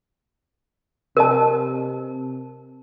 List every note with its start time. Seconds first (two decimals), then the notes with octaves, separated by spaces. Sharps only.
1.17 C3 A#4 D#5 A5